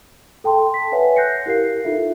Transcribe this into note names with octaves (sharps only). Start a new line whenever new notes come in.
A4 G5 A5 C6
B6
B4 C#5 E5 F#5 G#5
F#6 G6 A#6 C7 C#7
E4 G4 A#4 F5 C7
D#4 F4 A4 E5